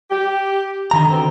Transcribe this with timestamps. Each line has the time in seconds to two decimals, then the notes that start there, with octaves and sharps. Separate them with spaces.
0.11 G4
0.91 D3 D#3 A#5
1.10 B2 C4